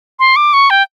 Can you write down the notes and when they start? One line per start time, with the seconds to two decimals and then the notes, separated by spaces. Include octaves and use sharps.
0.19 C6
0.36 D6
0.53 C#6
0.70 G5